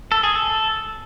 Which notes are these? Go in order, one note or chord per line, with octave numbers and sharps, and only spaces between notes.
A4
G#4
A4